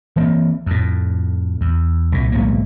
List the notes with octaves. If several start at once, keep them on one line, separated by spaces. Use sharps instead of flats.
E3 A#3 C4
F2 A2
E2
C2 A#2
D1 B1 G#2 A#3